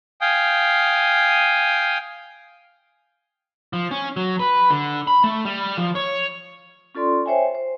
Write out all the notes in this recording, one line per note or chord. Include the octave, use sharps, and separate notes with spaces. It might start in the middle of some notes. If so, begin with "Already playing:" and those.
F5 G5 G#5 D#6
F3
C#4
F#3
B4
D3
B5
A3
G3
F3
C#5
C#4 F4 A4 D5 C6
C5 C#5 E5 G5 G#5
C5